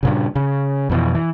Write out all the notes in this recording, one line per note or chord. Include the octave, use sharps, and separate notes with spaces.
G2 A#2 C#3
C#3
F2 B2 E3
E3